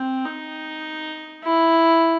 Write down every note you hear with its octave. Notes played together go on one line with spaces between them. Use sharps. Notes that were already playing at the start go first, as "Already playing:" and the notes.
Already playing: C4
D#4
E4